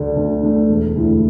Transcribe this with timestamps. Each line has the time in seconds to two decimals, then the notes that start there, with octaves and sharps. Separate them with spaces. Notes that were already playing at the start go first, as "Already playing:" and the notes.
Already playing: D2 D3 A3 D4
0.16 D2
0.43 D3 A3 D4
0.69 E1
0.95 D2 D3 A3 E4